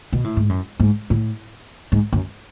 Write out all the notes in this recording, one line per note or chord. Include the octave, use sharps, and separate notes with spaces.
B2
A2
G#2
F#2
G#2
A2
G#2
F#2